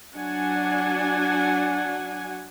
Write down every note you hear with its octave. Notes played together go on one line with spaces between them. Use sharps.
F#3 D4 F#5 G#5